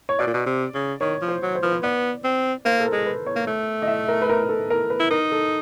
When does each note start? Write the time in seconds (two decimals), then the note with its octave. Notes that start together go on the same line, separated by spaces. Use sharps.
0.09 C#5
0.19 B2 D5
0.27 A#2
0.34 B2
0.46 C3
0.74 C#3
1.01 D#3 C#5
1.21 F3
1.28 C5
1.42 F#3
1.55 C5
1.63 F3 B4
1.72 C5
1.83 B3 D5
2.24 C4
2.65 A#3 C5
2.80 A4
2.85 A#4
2.92 G#3
3.06 B4
3.26 C#5
3.36 A#3
3.47 A3
3.82 D#5
3.88 E5
4.08 A#4
4.22 B4
4.29 A#4
4.49 A4
4.70 A#4
4.90 B4
5.00 E4
5.10 D#4 A#4
5.32 A4